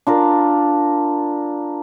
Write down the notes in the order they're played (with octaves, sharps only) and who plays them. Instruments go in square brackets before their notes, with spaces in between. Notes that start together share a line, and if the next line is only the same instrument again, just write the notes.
[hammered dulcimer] D4 F4 A#4